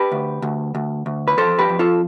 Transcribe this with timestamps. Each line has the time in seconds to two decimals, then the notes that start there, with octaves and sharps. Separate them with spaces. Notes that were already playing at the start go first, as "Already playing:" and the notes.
Already playing: G4 B4
0.12 D2
0.42 D2
0.75 D2
1.06 D2
1.28 B4
1.37 F2 A4 C5
1.59 G4 B4
1.69 F2
1.79 F4 A4